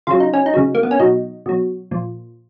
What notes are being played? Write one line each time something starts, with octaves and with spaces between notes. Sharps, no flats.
C#3 F#3 F4
D#4
C#4
D#4
C#3 F#3
A#3
B3
C#4
B2 F#3 D#4
B2 F#3
A#2 F3